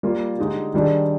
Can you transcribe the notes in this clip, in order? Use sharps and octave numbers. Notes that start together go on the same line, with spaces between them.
G3 A#3 F4
D3 G#3 D#4 G4
D#3 G3 D4 G#4